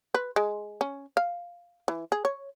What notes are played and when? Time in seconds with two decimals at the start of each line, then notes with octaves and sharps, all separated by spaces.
0.14 B4
0.36 G#3
0.81 C#4
1.17 F5
1.88 E3
2.12 G#4
2.25 C#5